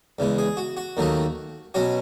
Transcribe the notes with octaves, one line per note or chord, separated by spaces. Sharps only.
E2 C#3 G#3
G#4
F#4
F#4
D#2 D#3 F#3 A3 D#4
B2 F#3 C#4 F#4